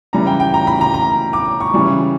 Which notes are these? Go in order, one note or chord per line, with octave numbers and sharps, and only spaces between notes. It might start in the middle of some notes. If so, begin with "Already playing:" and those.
C#3 E3 G3 A#5
G5
G5
A#5
B5
A#5
A#5
D6
C#6
C#3 E3 G3